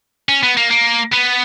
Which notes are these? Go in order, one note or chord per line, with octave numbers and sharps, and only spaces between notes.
C#4
B3
A#3
A#3
B3